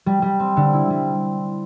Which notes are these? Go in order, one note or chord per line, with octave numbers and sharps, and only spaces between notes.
G3
G3
C4
D3
E4
G3